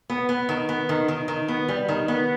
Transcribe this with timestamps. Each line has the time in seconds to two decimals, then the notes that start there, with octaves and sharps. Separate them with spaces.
0.10 B3
0.29 B3
0.49 D#3
0.69 B3
0.89 D#3
1.08 D#3
1.28 D#3
1.48 B3
1.69 G3
1.89 D#3
2.08 B3